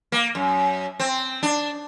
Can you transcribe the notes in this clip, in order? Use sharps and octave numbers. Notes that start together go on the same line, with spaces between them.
A#3
F#2
C4
D4